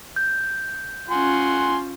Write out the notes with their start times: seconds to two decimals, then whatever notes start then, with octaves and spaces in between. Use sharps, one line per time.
0.16 G6
1.10 C#4 F4 F#5 G#5 C6